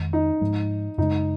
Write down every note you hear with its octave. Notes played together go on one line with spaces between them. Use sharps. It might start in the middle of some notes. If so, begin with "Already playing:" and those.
Already playing: F2 D#3 G#3
D#4
G#2 F3 G#3
F#2 C#3 G#3 D#4